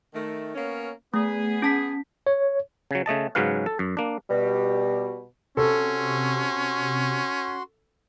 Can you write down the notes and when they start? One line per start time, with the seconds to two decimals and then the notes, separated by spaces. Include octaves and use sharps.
0.14 D#3 A3
0.55 A#3 B3 C#4
1.14 A3 B3 G#4
1.62 C#4 A5 B6
2.27 C#5
2.91 C#3 F#3
3.06 C#3 A3 D#5 A5
3.35 G#2 C#3 F#3 C#4 B4 F5
3.66 A4
3.79 F#2
3.97 A#3 D4
4.30 B2 G3
5.57 C3 C#4 F#4 A4 C6